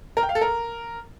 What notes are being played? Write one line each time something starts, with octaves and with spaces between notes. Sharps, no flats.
A#4
G5
F5
A4
A#4